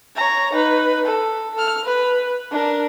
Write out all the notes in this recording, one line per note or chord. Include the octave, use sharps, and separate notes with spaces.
C#5 A#5
D#4 B4
A4
A4 F6
B4
D4 A#4